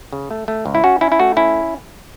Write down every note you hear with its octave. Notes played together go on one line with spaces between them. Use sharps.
C#3
A3
A3
C#2
E4
C#4 F#4
C#4 E4
E4
A3 F#4
C#4 E4